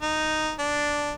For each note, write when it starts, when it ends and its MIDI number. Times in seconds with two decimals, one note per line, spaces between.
0.02 0.52 63
0.59 1.12 62